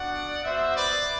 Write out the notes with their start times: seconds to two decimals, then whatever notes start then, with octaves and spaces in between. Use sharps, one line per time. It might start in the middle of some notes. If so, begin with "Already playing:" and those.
Already playing: B3 D4 F#4 D5 F#5
0.44 B3 F#4 C5 E5
0.76 B4 D5